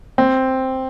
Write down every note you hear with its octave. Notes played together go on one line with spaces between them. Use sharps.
C4